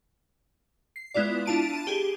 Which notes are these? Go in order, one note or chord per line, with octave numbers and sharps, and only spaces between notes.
C7
G#3 B3 E4 F4 D5
D4 E4 F4 A5 D7 D#7
G4 G#4